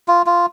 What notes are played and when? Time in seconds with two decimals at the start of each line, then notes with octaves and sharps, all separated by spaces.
0.08 F4
0.26 F4